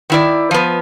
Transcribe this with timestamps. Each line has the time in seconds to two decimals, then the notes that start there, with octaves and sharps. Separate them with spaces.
0.10 D#3 E4 D5
0.51 F3 B3